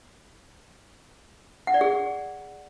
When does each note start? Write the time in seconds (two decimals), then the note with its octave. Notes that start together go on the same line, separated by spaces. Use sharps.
1.67 F#5
1.74 D5
1.81 G#4